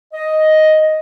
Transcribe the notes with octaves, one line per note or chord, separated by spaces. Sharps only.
D#5